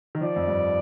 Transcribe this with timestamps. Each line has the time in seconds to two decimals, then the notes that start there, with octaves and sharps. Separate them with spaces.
0.15 D#3
0.21 F3 D5
0.36 F2
0.47 G2